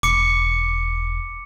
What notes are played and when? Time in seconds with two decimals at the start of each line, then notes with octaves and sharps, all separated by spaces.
0.03 E1 D6 C#7